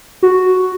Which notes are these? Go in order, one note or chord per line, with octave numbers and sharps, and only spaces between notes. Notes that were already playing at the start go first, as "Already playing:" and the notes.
F#4